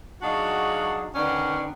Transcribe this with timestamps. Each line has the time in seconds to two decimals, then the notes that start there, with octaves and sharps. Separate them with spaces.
0.22 F#3 D4 D#4 F#4 G#4 F5
1.15 D3 D#3 B3 C#4 D4